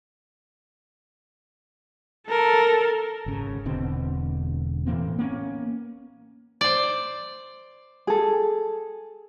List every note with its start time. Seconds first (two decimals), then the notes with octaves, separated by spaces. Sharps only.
2.28 A4 A#4
3.26 G#1 C#3
3.65 E1 B2 D3 C4
4.86 A2 E3 A#3 C4
5.19 A#3 B3 C#4
6.61 C5 D5
8.07 G#4 A4